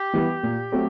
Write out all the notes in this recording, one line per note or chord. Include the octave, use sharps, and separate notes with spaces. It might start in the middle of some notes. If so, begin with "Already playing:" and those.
Already playing: G4
E3 G3 B3
A#2
F#3 A3 C4